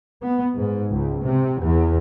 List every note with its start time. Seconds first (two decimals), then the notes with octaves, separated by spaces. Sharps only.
0.22 B3
0.54 G#2
0.92 C#2
1.22 C3
1.62 E2